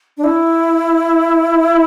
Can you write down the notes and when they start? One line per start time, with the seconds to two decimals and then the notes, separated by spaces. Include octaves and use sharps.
0.17 D4
0.24 E4